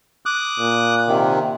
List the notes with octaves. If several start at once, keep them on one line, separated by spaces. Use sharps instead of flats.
D6 D#6 F#6
A#2
C3 D#3